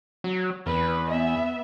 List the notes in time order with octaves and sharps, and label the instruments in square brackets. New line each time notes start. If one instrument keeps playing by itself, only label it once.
[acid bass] F#3
[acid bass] E2 [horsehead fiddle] B4
[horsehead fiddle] B3 E5